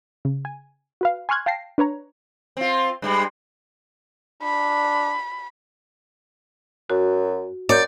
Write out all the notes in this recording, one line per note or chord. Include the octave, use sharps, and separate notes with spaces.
C#3
G#5
F#4 B4 F5
G#5 C6 C#6 F6 F#6 G#6
F5 G5 A5 A#6 C7
D4 B4 C#5 A#5
C4 F4
G2 G3 G#3
D4 B5
F#2 F#4
F#2 C#5 D5 G6